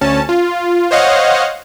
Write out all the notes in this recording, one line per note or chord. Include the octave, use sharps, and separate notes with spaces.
D2 C#4 A5
F4
C5 C#5 D#5 F5 F#5